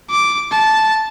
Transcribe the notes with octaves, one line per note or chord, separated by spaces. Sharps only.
D6
A5